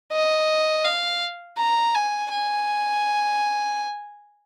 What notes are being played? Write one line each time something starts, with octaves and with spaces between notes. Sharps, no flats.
D#5
F5
A#5
G#5
G#5